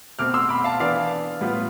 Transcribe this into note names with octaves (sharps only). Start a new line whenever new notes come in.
B2 A3 C4 D6 F6
C6 E6
B5 D6
F5 A5
E3 B3 D4 D5 F5
A2 G3 B3 F4